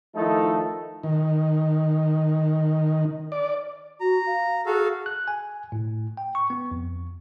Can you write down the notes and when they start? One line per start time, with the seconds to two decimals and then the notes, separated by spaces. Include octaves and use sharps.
0.15 D#3 F3 A3 D#4 E4 A4
1.03 D#3
3.32 D5
4.00 F#4 A#5
4.26 F5
4.66 F#4 G#4 A4 F5
5.06 F#6
5.28 G#5
5.72 A2
6.17 G5
6.35 C#6
6.50 B3
6.71 F2